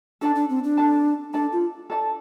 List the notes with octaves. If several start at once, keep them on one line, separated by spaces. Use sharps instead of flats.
D4 A4 D5 A5
D4
C4
D4
A4 D5 A5
D4 A4 D5 A5
F4
A4 D5 A5